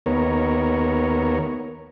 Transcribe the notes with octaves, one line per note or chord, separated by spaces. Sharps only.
D#2 B3 A#4 C#5